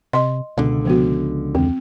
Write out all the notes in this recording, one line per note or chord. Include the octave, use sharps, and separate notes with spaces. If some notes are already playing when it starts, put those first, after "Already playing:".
C3 D#5 C6
C#2 B2 D3
F3 B3 F#4
E2 C4